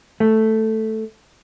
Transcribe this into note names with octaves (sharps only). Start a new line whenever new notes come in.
A3